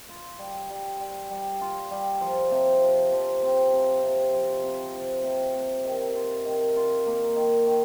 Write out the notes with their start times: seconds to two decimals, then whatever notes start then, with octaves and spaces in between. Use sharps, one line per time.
0.09 F4
0.39 G3
0.70 G3
1.00 G3
1.31 G3
1.61 F4
1.91 G3
2.21 F3
2.51 C3
2.82 F3
3.12 F3
3.43 C4
3.73 C3
4.03 C3
4.34 F3
4.64 C3
4.94 F3
5.24 C3
5.55 C3
5.85 D#3
6.15 F4
6.45 D#3
6.76 F4
7.07 A#3
7.36 D#3
7.67 D#3